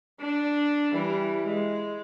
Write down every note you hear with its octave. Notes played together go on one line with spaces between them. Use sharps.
D4
E3 G3
G#3